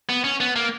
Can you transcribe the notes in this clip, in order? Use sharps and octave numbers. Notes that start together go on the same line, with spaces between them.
B3
C#4
B3
A#3